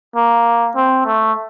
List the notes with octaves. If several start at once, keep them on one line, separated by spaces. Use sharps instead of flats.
A#3
C4
A3